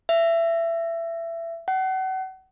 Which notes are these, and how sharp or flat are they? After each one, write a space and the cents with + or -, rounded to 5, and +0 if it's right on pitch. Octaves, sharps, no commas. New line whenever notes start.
E5 +20
F#5 +35